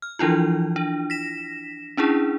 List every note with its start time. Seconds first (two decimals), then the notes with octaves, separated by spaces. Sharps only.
0.02 F6
0.19 E3 F3 D4 E4 F4
0.76 D4
1.10 A#6 B6 E7
1.97 C#4 D4 E4 G#4